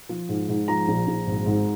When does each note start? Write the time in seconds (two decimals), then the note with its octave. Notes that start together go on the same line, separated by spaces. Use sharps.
0.09 F3
0.29 G#2
0.48 G#2
0.68 F3 A#5
0.88 A#1
1.07 A#1
1.27 G#1
1.46 G#2